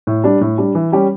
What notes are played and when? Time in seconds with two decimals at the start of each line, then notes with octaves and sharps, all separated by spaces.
0.07 A2
0.24 G3 D4
0.41 A2
0.58 G3 D4
0.75 E3
0.92 G3 C#4 G4